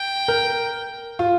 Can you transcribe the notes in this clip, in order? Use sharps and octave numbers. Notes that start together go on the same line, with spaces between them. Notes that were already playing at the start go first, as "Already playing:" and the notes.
Already playing: G5
A#4
F4